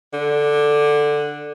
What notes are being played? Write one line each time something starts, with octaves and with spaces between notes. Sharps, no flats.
D3